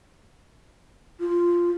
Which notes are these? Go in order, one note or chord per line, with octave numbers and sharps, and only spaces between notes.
F4